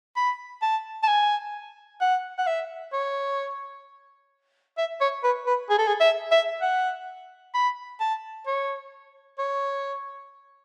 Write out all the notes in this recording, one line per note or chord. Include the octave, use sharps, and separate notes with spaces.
B5
A5
A5
G#5
F#5
F#5
E5
C#5
E5
C#5
B4
B4
G#4
A4
G#4
E5
E5
F#5
B5
A5
C#5
C#5